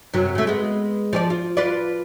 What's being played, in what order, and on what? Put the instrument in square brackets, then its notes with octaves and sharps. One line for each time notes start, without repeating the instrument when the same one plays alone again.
[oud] F#2 C3 F#3
C#3 A3
G#3 B3
F3 G4 D5
F4
F4 B4 D5